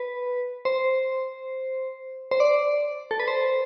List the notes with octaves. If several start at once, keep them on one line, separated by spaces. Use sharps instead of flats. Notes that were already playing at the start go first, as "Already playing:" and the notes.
Already playing: B4
C5
C5
D5
A4
B4
C5